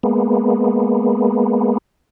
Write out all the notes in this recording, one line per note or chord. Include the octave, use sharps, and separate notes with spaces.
G#3 A#3 B3